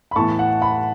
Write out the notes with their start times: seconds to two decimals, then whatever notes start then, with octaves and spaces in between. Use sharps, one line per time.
0.11 B5
0.16 A2 E3 B3 A5 C#6
0.39 F#5
0.62 F#5 B5